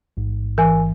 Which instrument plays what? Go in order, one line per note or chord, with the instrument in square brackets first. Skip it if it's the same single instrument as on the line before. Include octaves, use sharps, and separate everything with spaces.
[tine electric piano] A1 G#2
[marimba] E3 [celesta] A#4 G#5